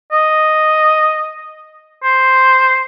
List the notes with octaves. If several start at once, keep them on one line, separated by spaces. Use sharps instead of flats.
D#5
C5